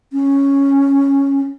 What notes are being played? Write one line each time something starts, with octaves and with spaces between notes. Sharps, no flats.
C#4